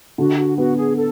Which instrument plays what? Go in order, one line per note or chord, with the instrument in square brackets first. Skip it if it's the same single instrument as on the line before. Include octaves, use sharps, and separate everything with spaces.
[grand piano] D3 [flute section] F#4
[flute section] F#4
[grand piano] B3 [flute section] F#4
[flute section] G#4
A4